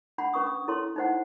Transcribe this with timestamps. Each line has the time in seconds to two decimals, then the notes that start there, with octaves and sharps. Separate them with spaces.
0.18 D4 F#5 B5
0.34 C#4 B4 C#6 D#6
0.47 D#6
0.68 E4 A4 C#5 C6
0.96 D#4 E4 C5 F#5